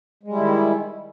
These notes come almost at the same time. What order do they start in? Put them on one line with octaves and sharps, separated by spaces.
G#3 G3 E4 D#3